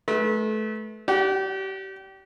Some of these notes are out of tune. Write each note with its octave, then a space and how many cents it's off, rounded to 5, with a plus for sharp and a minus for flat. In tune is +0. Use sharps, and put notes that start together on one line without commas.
A3 -30 B4 -25
G4 -30 D5 -30 F#5 +10